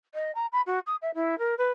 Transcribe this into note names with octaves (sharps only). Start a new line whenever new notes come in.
D#5
A#5
B5
F#4
D#6
E5
E4
A#4
B4